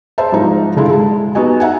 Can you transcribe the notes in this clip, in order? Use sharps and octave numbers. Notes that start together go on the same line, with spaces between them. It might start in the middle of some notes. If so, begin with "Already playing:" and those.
G#4 C5 E5 A5
C2 G#2 F3 D#4
D3 G3 G#3 E4 F4
G#3 A5
B3 D#4 F#4 D#5 G#5
D#4 E5 F#5 G#5